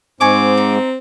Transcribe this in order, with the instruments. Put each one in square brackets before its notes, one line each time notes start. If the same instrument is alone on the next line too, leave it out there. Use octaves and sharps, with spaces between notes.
[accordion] G#2 [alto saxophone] C4 [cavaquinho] D#5 G#5 C#6 [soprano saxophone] D6
[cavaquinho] D#4